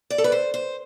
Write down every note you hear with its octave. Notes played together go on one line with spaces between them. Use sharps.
D5
A4
B4
C5
C5